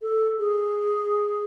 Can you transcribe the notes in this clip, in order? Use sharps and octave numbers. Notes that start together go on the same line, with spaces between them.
A4
G#4